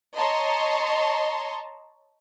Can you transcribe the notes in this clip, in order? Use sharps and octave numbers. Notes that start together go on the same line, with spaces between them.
C#5 D#5 A5 A#5 C6